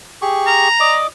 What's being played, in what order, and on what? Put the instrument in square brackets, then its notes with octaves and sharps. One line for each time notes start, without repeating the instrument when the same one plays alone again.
[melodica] G4 G#4 C#6
[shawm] A#5
[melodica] D5 D#5 D6